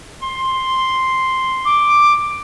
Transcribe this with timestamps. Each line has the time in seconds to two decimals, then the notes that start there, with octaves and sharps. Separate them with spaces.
0.22 C6
1.65 D6